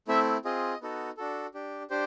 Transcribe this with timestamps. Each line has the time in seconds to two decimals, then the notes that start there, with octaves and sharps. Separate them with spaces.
0.08 A3 C4 E4 E5
0.45 C4 F4 G#4 D#5
0.81 B3 D#4 F#4 A4
1.17 D4 F#4 A4
1.54 D4 G4
1.90 D4 G4 C5